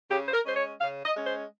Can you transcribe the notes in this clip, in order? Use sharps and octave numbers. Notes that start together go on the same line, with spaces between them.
C#3 G4
C5
A#4
G#3 C#4 C5
C#5
C#3 F5
D#5
G#3 C#4
C5